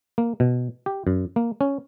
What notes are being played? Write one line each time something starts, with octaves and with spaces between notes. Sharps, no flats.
A#3
B2
G4
F#2
A#3
C#4